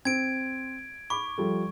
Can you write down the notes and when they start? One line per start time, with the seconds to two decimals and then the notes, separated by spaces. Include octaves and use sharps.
0.05 C4 G#6 D7
1.10 B5 C#6 D6
1.38 F3 G3 A4